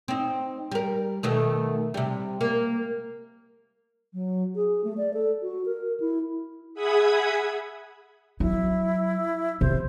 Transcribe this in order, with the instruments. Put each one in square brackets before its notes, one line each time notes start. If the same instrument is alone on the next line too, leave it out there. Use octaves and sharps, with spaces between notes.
[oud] C4 D#4
G3 A#4
B2 D#3 A3
C3 G3
A#3
[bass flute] F#3
G#4
A3
D5
A4
F#4
A#4
E4
[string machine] G#4 E5 F#5 B5 D#6 G#6
[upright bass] F#3 [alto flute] E4
[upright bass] C3 [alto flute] C5